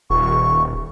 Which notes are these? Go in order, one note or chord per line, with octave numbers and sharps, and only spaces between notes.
D#1 C#6